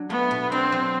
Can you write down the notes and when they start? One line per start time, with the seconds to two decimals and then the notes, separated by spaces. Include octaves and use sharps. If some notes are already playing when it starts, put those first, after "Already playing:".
Already playing: F#3 D4
0.10 A3 B3
0.31 B2
0.52 C4 D4
0.72 F#3